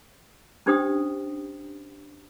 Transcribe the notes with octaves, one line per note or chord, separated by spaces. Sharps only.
C#4 D4 G4 C5 G5 D#6